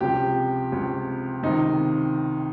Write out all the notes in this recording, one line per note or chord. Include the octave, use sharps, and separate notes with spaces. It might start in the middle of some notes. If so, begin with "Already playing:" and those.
C#2 C3 F3 G4
C#2 C3 F3
C#2 C3 D#3 D#4